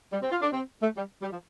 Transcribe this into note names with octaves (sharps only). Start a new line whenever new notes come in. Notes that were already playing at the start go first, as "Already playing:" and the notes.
G3
C4
F4
D4
C4
A3
G3
G3
F3